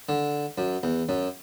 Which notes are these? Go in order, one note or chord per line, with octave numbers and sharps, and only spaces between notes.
D3
F#2
E2
F#2